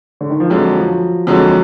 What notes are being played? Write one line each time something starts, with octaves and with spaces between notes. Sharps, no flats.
D3
D#3
F3
F2 D3 F#3 G#3
F3
F2 D3 F#3 G#3